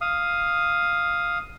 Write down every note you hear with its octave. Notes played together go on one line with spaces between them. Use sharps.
F5 D#6